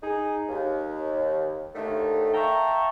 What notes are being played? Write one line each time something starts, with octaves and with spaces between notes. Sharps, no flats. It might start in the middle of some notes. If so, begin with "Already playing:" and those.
D#4 G#4
D#2
D#2 D3 D#3 A3
E5 F5 G5 A5 A#5 C#6